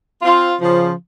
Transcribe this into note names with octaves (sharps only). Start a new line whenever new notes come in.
C4 F4
C#3 F3